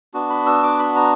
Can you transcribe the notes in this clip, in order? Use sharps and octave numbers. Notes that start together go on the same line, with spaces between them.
B3 D4 F#4
B5
E6
D6
B5
A#5